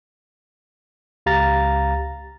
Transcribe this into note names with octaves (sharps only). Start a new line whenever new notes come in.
C#2 G4 F5 A#5 A6